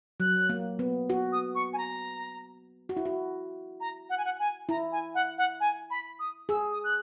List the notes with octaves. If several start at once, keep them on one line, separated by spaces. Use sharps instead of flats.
F#3 F#6
A#3
B3
F#4
D#6
C#6
G#5
A#5
F#4
E4
F#4
A#5
F#5
G#5
F#5
G#5
E4 A#5
G#5
F#5
F#5
G#5
B5
D#6
G#4 E6
D#6
F#6